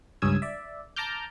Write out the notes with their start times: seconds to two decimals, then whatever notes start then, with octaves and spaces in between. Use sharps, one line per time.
0.22 C#2 G2 C#4 D#6 E6 G#6
0.42 D5 E5
0.96 A5 A#5 D6 F6 G6